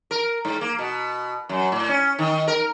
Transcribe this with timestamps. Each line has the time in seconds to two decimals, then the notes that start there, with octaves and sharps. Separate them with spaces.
0.11 A#4
0.45 G#2
0.61 A#3
0.79 B2
1.49 F#2
1.72 A2
1.89 C#4
2.19 D#3
2.48 A#4